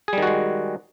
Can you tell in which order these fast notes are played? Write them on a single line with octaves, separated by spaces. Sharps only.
G#4 G3 D#3 F#4 G#3